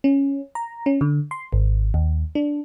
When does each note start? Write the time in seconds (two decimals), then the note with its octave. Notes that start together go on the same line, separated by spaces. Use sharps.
0.04 C#4
0.55 A#5
0.86 C#4
1.01 D3
1.31 C6
1.53 G#1
1.94 D#2
2.35 D4